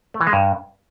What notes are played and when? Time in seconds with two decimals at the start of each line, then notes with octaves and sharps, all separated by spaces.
0.14 A3
0.21 E3
0.27 G#3
0.33 G2